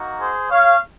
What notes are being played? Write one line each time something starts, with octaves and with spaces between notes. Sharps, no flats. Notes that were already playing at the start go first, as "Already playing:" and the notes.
Already playing: A#3 D#4 F#4
G#4 C5
C#5 F5